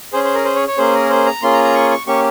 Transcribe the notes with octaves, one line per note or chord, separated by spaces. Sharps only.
C#4 G#4 C5
C5
A#4
C5
C#5
C#5
A#3 C#4 G#4 C5
A#4
C5
A#5
A#3 C#4 F4 G#4 C6
A#5
A#5
C#6
C#6
A#3 C#4 G4 C#6